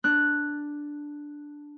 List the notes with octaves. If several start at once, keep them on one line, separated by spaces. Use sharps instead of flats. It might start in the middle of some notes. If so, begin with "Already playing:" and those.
D4 F#6